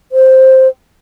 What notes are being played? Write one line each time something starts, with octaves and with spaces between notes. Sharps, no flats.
C5